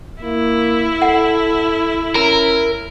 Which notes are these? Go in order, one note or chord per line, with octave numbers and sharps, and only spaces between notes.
A#3 E4
A4 F#5
C#4 A#4 A#5